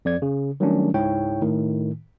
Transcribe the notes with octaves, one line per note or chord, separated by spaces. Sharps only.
F2 D5 G#6
C#3
D#3 F#3 G3 A3 C#4 D4
C#2 G#2 E4 C#5 G5
A2 D#3